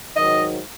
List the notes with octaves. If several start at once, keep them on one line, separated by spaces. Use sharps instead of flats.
G#2 D#3 F#3 D#5